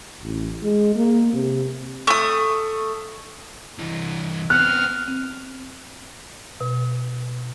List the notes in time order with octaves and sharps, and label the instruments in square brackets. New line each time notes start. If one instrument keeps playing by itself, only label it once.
[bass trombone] A1
G#3
A#3
C3
[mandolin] A3 D#6
[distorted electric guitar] C2 E3
[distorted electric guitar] B3 C4 [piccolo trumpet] F6 [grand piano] F#6
[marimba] C4
B2